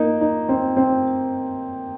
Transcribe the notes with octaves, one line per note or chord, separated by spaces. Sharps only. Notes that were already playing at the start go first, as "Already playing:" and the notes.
Already playing: A#3 D#4
D#4
C4
C4